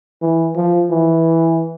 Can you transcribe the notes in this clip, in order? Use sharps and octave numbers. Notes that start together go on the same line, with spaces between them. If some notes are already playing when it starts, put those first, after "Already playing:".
E3
F3
E3